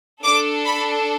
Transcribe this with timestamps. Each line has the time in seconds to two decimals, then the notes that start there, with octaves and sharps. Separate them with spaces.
0.24 D4 A4 D6
0.65 B5